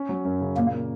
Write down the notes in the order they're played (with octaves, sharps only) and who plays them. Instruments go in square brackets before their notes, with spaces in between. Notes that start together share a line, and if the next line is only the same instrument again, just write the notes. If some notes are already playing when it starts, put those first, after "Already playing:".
Already playing: [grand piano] C#4
F#3
F#2
C#3
[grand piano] A#2 [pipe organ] A#3
[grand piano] A#3